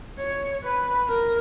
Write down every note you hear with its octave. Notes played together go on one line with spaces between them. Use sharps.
C#5
B4
A#4